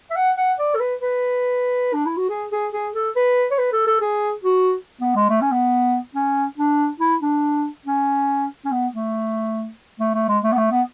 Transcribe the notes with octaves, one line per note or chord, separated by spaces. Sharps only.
E5
F#5
F#5
D5
A4
B4
B4
D4
E4
F#4
G#4
G#4
G#4
A4
B4
C#5
B4
A4
A4
G#4
F#4
B3
G#3
A3
C#4
B3
C#4
D4
E4
D4
C#4
C#4
B3
A3
A3
A3
G#3
A3
B3
A3
B3